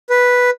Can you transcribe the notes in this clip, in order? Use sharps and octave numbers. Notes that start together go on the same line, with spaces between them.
B4